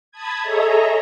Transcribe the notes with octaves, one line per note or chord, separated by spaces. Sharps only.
A5 B5 D#6 G#6
G#4 A4 C#5 D#5 E5 A#5